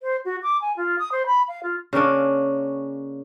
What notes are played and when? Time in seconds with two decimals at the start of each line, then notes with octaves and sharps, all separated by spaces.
0.01 C5
0.25 F#4
0.42 D6
0.61 G#5
0.76 F4
0.99 D#6
1.12 C5
1.26 B5
1.48 F5
1.63 F4
1.93 C#3 A#3 C#4 D4